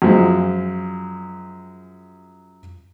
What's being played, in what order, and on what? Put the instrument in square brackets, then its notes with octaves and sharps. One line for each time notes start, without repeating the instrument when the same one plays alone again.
[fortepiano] F#2 F3 G#3